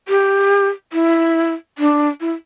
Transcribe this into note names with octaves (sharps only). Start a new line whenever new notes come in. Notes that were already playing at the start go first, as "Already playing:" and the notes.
G4
E4
D4
E4